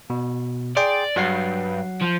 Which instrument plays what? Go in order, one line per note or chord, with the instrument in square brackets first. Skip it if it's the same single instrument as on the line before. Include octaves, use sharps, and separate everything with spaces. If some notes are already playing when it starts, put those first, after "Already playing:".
[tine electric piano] B2
[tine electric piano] G#4 G5 C6 [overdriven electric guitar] D5
[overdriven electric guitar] G2 [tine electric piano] F#3 F#5 C7
[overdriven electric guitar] F3